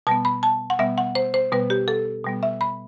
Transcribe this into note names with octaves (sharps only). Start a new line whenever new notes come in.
B2 G3 B3 A5
B5
A5
F#5
B2 G3 B3 E5
F#5
C5
C5
B2 G3 B3 B4
G4
A4
B2 G3 B3
E5
B5